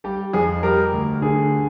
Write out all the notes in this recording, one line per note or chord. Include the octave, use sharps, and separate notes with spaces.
G3 G4
F2 G#4
G3 G4 A#4
D2
D3 G#4